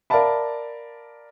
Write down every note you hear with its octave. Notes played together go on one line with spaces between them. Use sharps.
A#4 D5 E5 F5 A5 B5